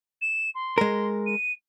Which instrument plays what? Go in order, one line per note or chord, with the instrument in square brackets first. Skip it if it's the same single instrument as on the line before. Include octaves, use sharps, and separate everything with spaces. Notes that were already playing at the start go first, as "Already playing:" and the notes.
[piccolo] E7
C6
[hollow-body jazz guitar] G#3 A#4
[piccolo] D#7